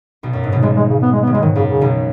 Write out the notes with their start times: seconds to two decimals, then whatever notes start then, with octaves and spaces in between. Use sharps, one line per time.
0.23 B1 B2
0.33 F#2
0.44 G#2
0.52 B1 B2
0.62 B1 B2 G#3
0.76 G#3
0.90 C#3
1.02 B3
1.12 G#3
1.22 B3
1.27 C#3
1.32 B2 G#3
1.42 G#2 D#3
1.56 F#2 C#3
1.69 C#3
1.81 B1 B2